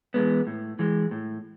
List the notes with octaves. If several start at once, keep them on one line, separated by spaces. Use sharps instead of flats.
E3 G#3 B3
A2
E3 G#3
A2